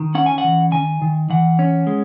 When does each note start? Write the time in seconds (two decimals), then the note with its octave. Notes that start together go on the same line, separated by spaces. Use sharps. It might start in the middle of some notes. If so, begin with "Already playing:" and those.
Already playing: D#3
0.15 C#4 F#5
0.26 G#5
0.38 F#5
0.44 E3
0.72 D#3 G#5
1.02 D#3
1.30 E3 F#5
1.59 C#4
1.87 G#3